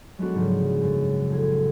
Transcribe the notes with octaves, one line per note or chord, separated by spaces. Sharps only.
F#3 G#3 B3 D4 F#4
G#2 C#3 F3
F#2
A1 G#6